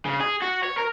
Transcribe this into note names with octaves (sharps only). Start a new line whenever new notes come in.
C#3
G#4
F#4
C#5
A#4